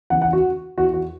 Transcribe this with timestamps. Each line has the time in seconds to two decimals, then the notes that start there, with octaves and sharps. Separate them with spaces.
0.10 E2 C#3 E3 F#5
0.22 F#5
0.33 F#4
0.78 E2 E3 F#4
0.93 F#4